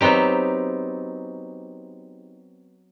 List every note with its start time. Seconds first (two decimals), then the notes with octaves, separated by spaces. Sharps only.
0.01 F#3 B3 C4 D#4 G4